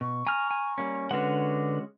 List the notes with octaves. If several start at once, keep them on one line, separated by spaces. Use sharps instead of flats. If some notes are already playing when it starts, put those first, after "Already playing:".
B2 C#6
G#5 A#5 F6
G#5
G3 A#3 C#4
D3 G#3 C#4 F#4 B4 F#5